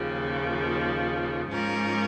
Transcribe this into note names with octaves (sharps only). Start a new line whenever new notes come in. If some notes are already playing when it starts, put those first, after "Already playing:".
Already playing: D#2 C#3 F3
G#2 F3 C#4 A#4